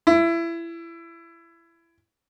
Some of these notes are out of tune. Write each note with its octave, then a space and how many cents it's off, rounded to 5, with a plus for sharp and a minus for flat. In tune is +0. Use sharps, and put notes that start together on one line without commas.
E4 +25